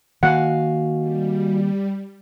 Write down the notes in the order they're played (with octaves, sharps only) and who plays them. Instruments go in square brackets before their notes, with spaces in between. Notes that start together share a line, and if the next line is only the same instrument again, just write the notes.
[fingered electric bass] D#3 A#3 [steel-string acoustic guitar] F#4 F5 G#5 [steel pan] F#5
[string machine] G3